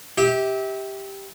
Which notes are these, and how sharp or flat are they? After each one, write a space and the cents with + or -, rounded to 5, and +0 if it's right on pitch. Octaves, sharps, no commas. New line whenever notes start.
G4 +0 E5 -30